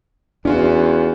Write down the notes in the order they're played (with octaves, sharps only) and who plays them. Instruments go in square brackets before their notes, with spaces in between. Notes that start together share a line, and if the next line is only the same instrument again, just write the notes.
[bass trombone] E2 [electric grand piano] C#4 F4 F#4 [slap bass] D4